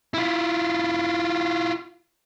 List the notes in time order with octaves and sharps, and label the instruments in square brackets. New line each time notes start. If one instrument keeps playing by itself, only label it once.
[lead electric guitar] E4 F4